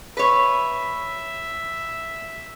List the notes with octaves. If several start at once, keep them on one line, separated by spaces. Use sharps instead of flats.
B4 C#5 E5